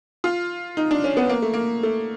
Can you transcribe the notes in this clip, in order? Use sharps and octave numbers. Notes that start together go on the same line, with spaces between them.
F4
D#4
D4
C#4
B3
A#3
A3
A#3
A3